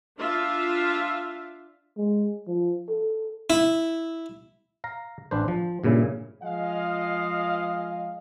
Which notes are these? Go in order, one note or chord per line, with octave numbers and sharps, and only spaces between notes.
D4 F4 E5 F5
G#3
F3
A4
E4
F5 A#5
A1 D4 B4 C5
F3
G2 A#2 C#3 E4
F3 G#3 D#5 F5